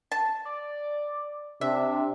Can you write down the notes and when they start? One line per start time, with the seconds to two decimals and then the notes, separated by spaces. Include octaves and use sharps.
0.12 A5
0.45 D5
1.61 C3 D4 E5